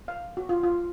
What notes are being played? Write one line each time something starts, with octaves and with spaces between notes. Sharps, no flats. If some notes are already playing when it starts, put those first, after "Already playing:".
F5
F#4
F4
F4